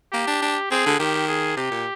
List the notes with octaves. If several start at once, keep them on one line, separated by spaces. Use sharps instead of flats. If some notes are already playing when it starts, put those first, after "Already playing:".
A#3 G4
D4
D4
C4 G#4
D3
D#3 G4
G#4
C3 G4
A#2